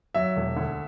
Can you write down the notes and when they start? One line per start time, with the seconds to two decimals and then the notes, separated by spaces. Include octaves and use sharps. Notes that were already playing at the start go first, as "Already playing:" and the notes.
0.14 F#3 E5
0.36 E1
0.56 D2